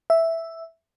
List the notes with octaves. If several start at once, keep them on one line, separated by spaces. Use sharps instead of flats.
E5